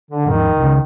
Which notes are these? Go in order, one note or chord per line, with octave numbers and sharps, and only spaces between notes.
D3
G#1 D#2 D#3 F3
C#2 C#3